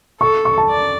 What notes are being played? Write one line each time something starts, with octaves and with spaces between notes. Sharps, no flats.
A4 C#6
C#6
A5
D5